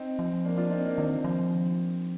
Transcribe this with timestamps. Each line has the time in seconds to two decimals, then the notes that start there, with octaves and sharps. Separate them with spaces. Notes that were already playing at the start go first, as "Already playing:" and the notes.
Already playing: C4 D#4
0.19 F3
0.45 A#3 D4
0.57 D4 F4
0.71 C4 D#4
0.84 A#3 D4
0.97 D#3 C4 D#4
1.24 F3